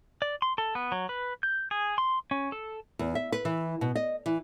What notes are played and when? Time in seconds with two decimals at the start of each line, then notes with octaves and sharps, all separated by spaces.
0.22 D5
0.42 C6
0.58 A4
0.75 B3
0.92 F#3
1.09 B4
1.43 G6
1.71 G#4
1.98 C6
2.31 C#4
2.52 A4
2.99 E2
3.15 E5
3.32 B4
3.45 E3
3.81 B2
3.95 D#5
4.26 E3